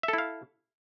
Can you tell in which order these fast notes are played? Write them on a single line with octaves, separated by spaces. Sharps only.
E5 A4 E4 F5